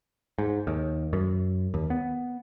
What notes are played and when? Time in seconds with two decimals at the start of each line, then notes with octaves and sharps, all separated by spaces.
0.38 G#2
0.67 D#2
1.13 F#2
1.74 D#2
1.90 B3